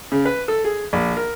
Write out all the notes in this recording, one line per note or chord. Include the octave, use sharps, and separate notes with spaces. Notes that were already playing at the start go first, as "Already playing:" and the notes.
C#3
B4
A4
G#4
A#1
A#4